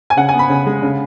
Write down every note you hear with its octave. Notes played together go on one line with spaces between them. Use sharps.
G#5
C#3 F#5
B3 G#5
B5
C#3
G#3
C#3